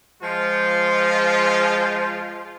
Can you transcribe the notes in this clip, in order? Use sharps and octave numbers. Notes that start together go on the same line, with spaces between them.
F3 G#3 F4